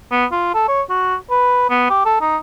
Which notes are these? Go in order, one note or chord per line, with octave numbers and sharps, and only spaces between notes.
B3
F4
A4
C#5
F#4
B4
B3
G4
A4
D#4